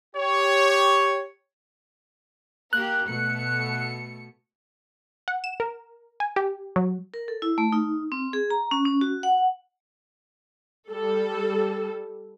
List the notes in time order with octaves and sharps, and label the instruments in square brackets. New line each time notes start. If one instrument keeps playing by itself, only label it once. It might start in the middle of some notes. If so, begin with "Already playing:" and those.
[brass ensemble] G4 C#5
[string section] A#3 G4 A#4 [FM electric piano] F#6
[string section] B2 A3 C#7
[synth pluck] F#5
E7
A#4
G#5
G4
F#3
[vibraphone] A#4
A4
E4
A3
D#4
C4
G#4
A#5
C#4
C#4
F#4
F#5
[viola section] G3 A4